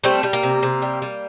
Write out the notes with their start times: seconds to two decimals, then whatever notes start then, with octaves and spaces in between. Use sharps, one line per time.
0.04 G3 A3 C4
0.23 G3
0.33 A#3
0.43 C3
0.63 C3
0.82 G3
1.02 G3